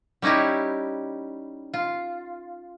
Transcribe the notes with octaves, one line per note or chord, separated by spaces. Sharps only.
G3 C#4 D#4 E4 G4
F4